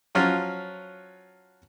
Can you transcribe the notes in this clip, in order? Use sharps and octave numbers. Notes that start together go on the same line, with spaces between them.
F3 F#3 C#4 F4